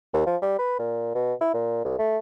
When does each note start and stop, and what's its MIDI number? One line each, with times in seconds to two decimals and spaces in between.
0.14 0.23 39
0.26 0.37 53
0.42 0.56 55
0.59 0.77 71
0.79 1.13 46
1.15 1.34 47
1.41 1.53 64
1.54 1.82 46
1.85 1.95 36
1.99 2.18 57